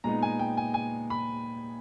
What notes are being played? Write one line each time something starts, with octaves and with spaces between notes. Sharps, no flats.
A#2 G#3 B3 D#4 A#5
G#5
G5
G#5
G#5
B5